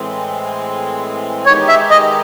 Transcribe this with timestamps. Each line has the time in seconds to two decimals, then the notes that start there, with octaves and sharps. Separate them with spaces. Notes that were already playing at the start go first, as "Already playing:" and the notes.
Already playing: A2 E3 G#3 C4
1.45 D#3 G#3 B3 D#4 G4 C#5
1.68 E5
1.90 D#5